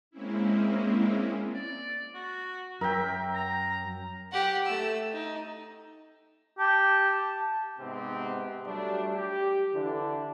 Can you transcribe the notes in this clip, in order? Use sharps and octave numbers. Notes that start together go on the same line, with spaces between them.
G#3 A#3 C4 C#4 E4
D5
F#4
F#2 A#4 E5 G5
A#5
G4 F#5
A3 E6
D#4
G4 A5
G#2 C3 B3 C4 G4
F#3 G3 A3 D4
G4
D3 E3 D4